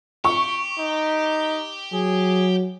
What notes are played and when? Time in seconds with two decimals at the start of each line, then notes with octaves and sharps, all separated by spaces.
0.25 G4 C#6
0.79 D#4
1.93 F#3 G#4